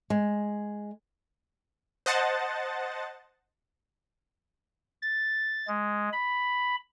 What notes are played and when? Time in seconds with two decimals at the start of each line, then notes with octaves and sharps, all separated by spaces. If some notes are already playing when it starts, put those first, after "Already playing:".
0.10 G#3
2.06 C5 D#5 F#5 A5 A6
5.02 A6
5.68 G#3
6.12 B5